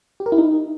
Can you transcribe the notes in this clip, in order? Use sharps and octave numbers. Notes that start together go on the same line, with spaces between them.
G4
A#4
E4
D#4